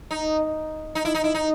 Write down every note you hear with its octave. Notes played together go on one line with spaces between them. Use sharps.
D#4
D#4
E4
D#4
E4
D#4